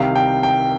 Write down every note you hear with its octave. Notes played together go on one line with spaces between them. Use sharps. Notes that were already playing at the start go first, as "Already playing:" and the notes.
Already playing: C2 C3 D#3 F5
G5
G5